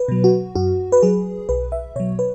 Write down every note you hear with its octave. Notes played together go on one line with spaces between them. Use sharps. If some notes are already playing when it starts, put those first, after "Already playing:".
Already playing: B4
B2 F#3
F#4
F#2 F#4
B4
F#3 G#4
B1 B4
E5
B2 F#3 C#5
B4